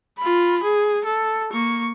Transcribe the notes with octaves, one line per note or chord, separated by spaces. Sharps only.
F4 B5
G#4
A4
A#3 C#6